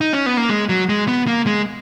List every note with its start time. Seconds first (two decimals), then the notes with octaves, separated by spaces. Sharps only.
0.01 D#4
0.13 C#4
0.26 B3
0.37 A#3
0.50 G#3
0.69 F#3
0.89 G#3
1.08 B3
1.27 A#3
1.47 G#3